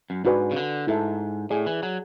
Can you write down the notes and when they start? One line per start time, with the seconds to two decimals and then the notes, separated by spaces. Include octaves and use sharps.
0.10 F#2
0.25 G#2 D4 F#4 B4 D5 G#5
0.51 C#3
0.56 D3
0.87 G#2 E4 A4 E5 A5
1.50 A2 G#4 D5 G#5
1.66 E3
1.83 F#3